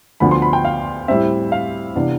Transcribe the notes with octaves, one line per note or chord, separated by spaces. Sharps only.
D2 D3 F3 B3 B5
C6
B5
G5
F5
A2 G3 C4 E5
F5
C3 E3 B3 D4